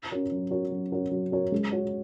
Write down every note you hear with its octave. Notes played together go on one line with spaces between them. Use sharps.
C#4 F#4 A#4 C#5
F#3
C#4 F#4 A#4 C#5
F#3
C#4 F#4 A#4 C#5
F#3
C#4 F#4 A#4 C#5
G#3
F#4 C#5